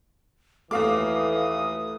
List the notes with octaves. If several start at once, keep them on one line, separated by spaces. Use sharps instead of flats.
D#2 E3 A3 F#4 A4 F5 D6 D#6